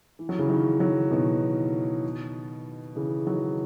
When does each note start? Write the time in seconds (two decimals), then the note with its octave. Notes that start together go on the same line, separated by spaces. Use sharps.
0.19 E3
0.29 F#3
0.39 C#3 E3
0.49 D#3 F#3
0.80 D#3 F#3
1.11 B2 D#3
2.96 C#3 E3
3.26 D#3 F#3